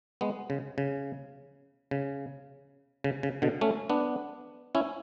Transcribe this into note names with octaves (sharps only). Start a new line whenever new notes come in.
G#3 B3
C#3
C#3
C#3
C#3
C#3
B2 D3
A3 C#4
B3 D4
C#4 E4